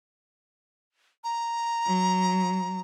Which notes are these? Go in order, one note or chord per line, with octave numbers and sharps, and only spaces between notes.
A#5
F#3